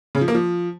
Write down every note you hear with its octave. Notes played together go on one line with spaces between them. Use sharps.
C#3
F3
A#3
F3